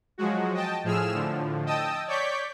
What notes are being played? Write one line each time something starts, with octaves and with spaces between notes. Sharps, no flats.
F3 F#3 G#3 F#4
D#5 G5 A5
A2 F3 G#4 E6 F6 E7
A2 D3 F3
D#5 G5 A5 D#6 E6
C#5 D5 C#6 D6 G6 B6